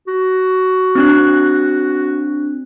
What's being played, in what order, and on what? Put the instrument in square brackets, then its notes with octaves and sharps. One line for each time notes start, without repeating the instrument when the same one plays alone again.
[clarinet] F#4
[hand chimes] C4 D4 F#6